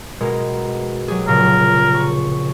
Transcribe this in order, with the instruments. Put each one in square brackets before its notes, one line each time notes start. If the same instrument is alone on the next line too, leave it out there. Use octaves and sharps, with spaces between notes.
[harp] B2 G#3 A#4
F#3 G4 G#4
[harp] F1 A#2 C#3 [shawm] A#4
[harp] C#6